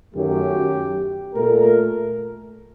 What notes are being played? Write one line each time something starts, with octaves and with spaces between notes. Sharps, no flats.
F#2 D#3 F#3 A3 G4
A#2 A3 A#4